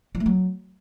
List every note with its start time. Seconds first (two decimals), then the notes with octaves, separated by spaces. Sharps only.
0.15 F3
0.20 A3
0.26 F#3